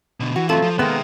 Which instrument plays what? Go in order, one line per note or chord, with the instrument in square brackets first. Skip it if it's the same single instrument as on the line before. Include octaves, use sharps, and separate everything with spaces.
[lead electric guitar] B2 D3
[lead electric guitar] E3 [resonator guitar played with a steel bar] F#4
[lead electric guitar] E3 C4 [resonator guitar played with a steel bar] F#3 A3 F4 [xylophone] A4 A5
[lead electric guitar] F3
[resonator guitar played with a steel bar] D#3 G#3 [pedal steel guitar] A#3 B3 [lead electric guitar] E5 G5